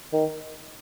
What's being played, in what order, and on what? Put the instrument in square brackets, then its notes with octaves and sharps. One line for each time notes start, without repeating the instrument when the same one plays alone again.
[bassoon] D#3